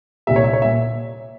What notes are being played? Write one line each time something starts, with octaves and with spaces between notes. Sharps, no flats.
C2 A#2 G3 E5
C#5
E5
C#5
A#2 E5